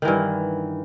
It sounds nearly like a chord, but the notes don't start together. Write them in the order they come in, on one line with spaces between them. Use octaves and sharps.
D#3 E3 G2